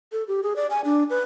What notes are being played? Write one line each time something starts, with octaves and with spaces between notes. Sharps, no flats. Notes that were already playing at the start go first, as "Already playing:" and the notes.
A4
G4
G#4
D5
G#5
D4
B4